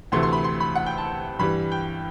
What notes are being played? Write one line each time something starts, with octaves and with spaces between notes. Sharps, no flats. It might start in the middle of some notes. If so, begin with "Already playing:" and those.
D2 C3 E3 A3 C6
C6
B5
C6
B5
F#5
G5
A5
G2 E3 G3 B5
G5